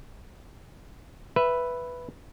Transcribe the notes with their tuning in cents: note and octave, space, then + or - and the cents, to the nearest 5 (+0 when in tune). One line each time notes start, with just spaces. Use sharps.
B4 +0 E5 +10